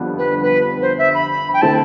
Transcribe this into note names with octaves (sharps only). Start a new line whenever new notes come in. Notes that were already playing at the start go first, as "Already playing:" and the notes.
Already playing: F2 D3 G3 B3 F4
B4
B4
C5
E5
B5
G5
D3 A3 C4 E4 A5